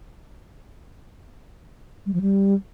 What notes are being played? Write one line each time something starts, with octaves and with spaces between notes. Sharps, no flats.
G3
F3
G3